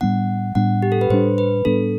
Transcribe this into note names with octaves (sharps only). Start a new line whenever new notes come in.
A2 G3 B3 D4 F#5
A2 G3 B3 D4 F#5
G4
A4
B4
A2 G3 B3 D4 C5
B4
A2 G3 B3 D4 A4